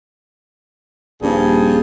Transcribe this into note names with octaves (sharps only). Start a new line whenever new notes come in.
D#1 G2 F3 G#4